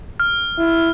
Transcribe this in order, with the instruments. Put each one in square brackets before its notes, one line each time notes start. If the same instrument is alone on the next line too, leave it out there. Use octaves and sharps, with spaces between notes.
[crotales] F6
[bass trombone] E4